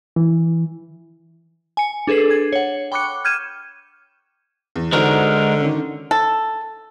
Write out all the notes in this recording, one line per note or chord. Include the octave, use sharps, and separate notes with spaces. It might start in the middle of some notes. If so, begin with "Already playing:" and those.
E3
G#5 C#7
D4 G#4 A4 B4 C7
G#6
C#5 F#5
G5 B5 C#6 D6 F#6 C#7
F6 G6 G#6 D#7 E7
E2
D3 G#3 D#4 F#4 A#4 C5
D#3 C#4
A4